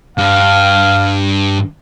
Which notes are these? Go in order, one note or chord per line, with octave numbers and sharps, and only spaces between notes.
G2 F5